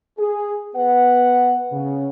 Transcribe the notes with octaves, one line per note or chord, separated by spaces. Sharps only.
G#4
B3 B4 F#5
C#3